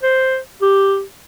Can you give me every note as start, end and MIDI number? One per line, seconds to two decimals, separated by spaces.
0.03 0.38 72
0.62 1.02 67